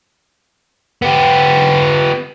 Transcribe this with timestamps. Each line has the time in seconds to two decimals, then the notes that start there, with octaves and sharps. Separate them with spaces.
1.02 B3 G4